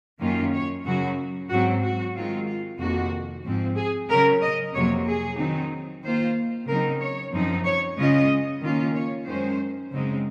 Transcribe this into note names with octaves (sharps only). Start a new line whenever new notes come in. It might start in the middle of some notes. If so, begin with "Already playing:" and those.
F#2 D#3 A#3 C#4 F4
C#5
F#2 C#3 F#3 F#4
G#2 F#3 C4 F#4
F#4
D#3 G#3 C4 F4
F4
F2 C3 D#3 A#3 F#4
G#2 F3 C4
G#4
C#3 F#3 C#4 A#4
D#5
F2 C3 F#3 A#3 C#5
G#4
D#3 F#3 C4 D#4
D#3 A#3 F4 C5
C#3 F#3 C4 D#4 A#4
C#5
F#2 F3 C4 D#4
C#5
C#3 G#3 C#4 F4 D#5
D#3 A#3 C#4 F4
C#5
F#2 D#3 G#3 C#4 C5
F#2 C#3 G#3 C4 D#4